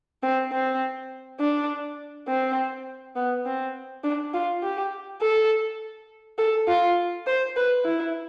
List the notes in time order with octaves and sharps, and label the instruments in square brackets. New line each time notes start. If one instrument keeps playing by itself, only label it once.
[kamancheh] C4
C4
D4
C4
B3
C4
D4
F4
G4
A4
A4
F4
C5
B4
E4